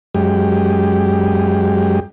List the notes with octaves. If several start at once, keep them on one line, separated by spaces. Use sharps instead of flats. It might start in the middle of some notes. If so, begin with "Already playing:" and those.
F#2 G#3 G4